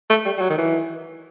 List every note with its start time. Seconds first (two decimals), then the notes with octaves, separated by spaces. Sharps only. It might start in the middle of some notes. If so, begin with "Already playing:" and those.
0.10 A3
0.26 G3
0.37 G3
0.41 F#3
0.50 D#3
0.58 E3